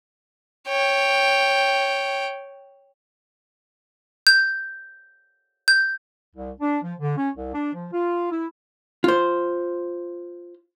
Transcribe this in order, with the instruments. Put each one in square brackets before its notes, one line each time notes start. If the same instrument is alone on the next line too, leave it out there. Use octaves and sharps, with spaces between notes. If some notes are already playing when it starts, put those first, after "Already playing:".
[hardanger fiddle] C#5 G5
[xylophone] G6
G6
[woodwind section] C2
D4
F3
D3
C#4
C2
D4
F3
F4
E4
[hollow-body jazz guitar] F4 C5